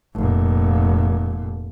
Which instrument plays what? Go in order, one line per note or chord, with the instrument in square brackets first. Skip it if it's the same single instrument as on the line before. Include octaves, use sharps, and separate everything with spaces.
[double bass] F1 A#2